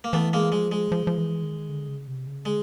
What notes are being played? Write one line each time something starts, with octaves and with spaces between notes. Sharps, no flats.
A#3
E3 A3 B3
G#3 A#3
F3 G#3
G#3
F3
F3
E3
D#3
D3
C#3
C3
C#3
D3 G#3